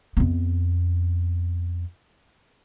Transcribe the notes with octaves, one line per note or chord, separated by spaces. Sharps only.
F2 B3